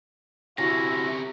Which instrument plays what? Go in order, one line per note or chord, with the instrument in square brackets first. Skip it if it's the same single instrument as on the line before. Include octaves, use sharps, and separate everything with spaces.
[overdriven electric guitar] C3 C#4 [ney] E4 [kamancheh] F#4 [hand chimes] A#6